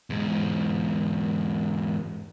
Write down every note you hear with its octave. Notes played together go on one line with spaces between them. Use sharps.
E2 G#2